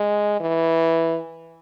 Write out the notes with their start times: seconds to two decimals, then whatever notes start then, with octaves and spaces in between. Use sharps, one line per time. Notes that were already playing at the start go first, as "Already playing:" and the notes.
Already playing: G#3
0.40 E3